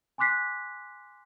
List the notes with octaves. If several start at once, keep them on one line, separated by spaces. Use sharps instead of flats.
G#5 C6 D6 F#6 B6 C7